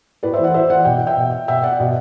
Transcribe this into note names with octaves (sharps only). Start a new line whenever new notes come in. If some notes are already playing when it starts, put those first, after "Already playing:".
A2 B4 D5
C5 E5
E3
D5 F#5
A2 C5 E5
E3 D5 F#5
B2 G5
E5 G5
B2
B2 E5 G5
D5 F#5
B2